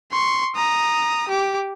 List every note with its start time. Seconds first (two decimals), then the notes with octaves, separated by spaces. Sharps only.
0.12 C6 C#6
0.55 A#5 D#6
1.28 G4 D6